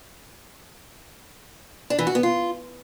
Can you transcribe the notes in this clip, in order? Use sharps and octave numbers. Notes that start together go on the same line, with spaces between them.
D4
E3
F#4
B3
F4